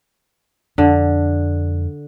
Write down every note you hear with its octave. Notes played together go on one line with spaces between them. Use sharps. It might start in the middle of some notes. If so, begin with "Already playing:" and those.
F2 D3